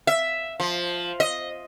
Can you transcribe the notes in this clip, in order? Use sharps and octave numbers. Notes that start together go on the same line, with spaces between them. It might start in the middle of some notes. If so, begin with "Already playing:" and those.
E5
F3
D#5